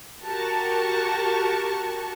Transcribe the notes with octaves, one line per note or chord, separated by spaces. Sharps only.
F#4 G4 A#4 A5 C#6